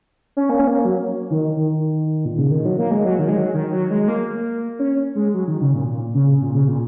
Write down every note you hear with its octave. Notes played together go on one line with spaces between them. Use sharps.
C#4
A#3
C#4
A#3
F#3
D#3
D#3
A#2
C#3
D#3
F#3
A#3
G#3
F#3
D#3
G#3
F#3
D#3
F#3
G#3
G#3
A#3
C#4
G#3
F#3
D#3
C#3
A#2
A#2
C#3
A#2
C#3
A#2